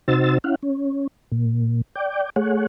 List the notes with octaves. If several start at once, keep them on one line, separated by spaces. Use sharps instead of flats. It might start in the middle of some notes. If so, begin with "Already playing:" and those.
C3 D#4 F#4 C5 E6 A6
C#4 E4 F5 F#5
C#4
A#2
D5 G5
A3 G#4 C#5 F#5